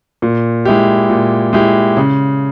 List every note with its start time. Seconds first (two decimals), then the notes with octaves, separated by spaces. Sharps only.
0.22 A#2
0.65 G#3 E4 G4
1.10 A#2
1.53 G#3 E4 G4
1.97 C#3